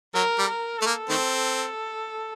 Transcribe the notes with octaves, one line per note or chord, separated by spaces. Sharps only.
F#3 A#4
G3
A#4
A3 A4
A#3
D#3 A3 C4